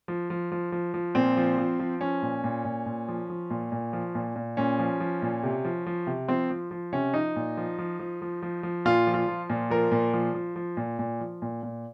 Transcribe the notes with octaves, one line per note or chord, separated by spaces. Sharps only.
F3
F3
F3
F3
F3
A#2 C4
F3
F3
F3
F3 C#4
A#2
A#2
A#2
A#2
F3
F3
A#2
A#2
F3
A#2
A#2
A#2 C#4
F3
F3
A#2
C3
F3
F3
C3
F3 C4
F3
F3
C3 C#4
F3 D#4
A#2
F3
F3
F3
F3
F3
F3
A#2 F4
F3
F4
F3
A#2
F3 A#4
A#2
F3
F3
F3
A#2
A#2
F3
A#2
A#2